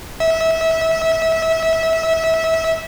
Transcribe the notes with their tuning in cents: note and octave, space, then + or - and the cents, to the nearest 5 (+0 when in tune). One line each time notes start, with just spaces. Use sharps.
E5 -25